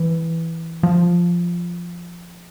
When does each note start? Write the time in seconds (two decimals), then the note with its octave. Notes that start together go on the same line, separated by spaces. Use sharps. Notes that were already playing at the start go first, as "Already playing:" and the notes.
Already playing: E3
0.83 F3